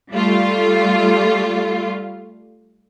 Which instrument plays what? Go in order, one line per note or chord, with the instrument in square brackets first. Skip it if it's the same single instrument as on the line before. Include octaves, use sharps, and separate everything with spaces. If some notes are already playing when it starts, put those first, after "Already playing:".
[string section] G3 A3 F4